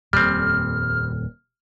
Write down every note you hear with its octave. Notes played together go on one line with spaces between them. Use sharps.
D#1 F2 A#2 G3 C4 F6